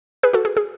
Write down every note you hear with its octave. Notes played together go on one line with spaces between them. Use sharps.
G#4 B4
F#4 A4
G#4
G#4